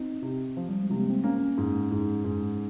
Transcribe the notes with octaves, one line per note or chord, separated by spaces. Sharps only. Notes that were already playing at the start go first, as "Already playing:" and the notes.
Already playing: C4 D#4
C3
F3
G3
G#3
C3
A#3
C4
A#3 C#4
G#2
G#2
G#2